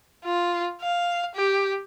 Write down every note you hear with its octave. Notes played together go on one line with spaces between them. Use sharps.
F4
F5
G4